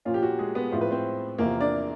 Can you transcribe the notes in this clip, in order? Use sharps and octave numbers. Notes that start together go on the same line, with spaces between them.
A#2 F3 A#3 C#4 F4
G4
F#4
G#3 G#4
B3 B4
A2 F3 G#3 C4 F4 C5
B4
C4 C5
E2 C3 F3 A#3 A#4
D4 D5